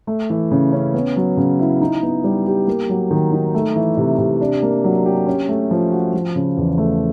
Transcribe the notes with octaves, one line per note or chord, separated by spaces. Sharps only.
A3
E3
C#3
C#4
B3
F#3
C#3
E4
D#4
B3
G3
G4
A#3
F#3
D#3
D#4
A3
E3
C3
C3
D4
A#3
F#3
G4
C#4
A3
F3
F#4
F3
C#3
E2
A3